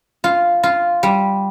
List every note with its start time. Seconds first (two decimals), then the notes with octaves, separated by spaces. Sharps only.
0.24 F4
0.63 F4
1.03 G3